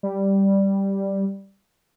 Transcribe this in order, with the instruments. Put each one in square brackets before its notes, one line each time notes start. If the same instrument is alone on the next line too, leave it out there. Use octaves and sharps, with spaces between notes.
[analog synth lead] G3